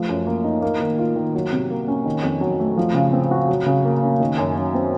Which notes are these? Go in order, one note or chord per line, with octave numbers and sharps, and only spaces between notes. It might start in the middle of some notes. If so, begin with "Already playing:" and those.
Already playing: F3 A3
F#2
A#3
D#4
A#3
D#3
F4
D#3
F#3
C3
A#3
C#4
D#3
F2
F#3
A3
F3
C#3
C4
F#4
F#3
C#3
A#3
C#4
D#3
F#2
F#3
C4